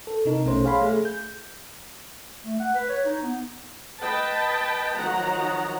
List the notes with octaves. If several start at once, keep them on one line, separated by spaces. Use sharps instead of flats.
A4
C3 D#4 A#4
A#1 B2 A3 C#4 C5
G#4 C#5 F5 G#5 B5 C6
A3 G#4
G6
A3
F#5
B4
C#5
D#4
B3
B4 D#5 G5 A5
D#3 F3 F#3 F#5 A#5